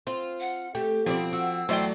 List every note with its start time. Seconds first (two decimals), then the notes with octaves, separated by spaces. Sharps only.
0.07 C4 F4
0.40 F#5
0.75 A3 G4 G5
1.06 B2 F3 G3 C4 D5
1.33 F#4 E6
1.69 E2 F#3 A3 C5 D5 E5 G5